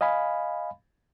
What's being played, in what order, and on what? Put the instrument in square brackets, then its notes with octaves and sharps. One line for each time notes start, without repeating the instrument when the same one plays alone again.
[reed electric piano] D#5 F5 G#5 B5